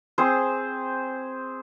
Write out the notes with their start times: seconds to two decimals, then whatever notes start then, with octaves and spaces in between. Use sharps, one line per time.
0.18 C4 G#4 C5